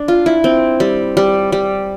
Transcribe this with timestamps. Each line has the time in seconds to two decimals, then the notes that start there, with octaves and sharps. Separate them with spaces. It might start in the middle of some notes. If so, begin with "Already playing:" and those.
Already playing: D4
0.08 F4
0.26 E4
0.44 C4
0.80 G3
1.17 G3
1.52 G3